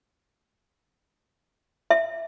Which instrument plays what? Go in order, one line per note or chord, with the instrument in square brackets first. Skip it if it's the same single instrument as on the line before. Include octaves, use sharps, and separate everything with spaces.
[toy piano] E5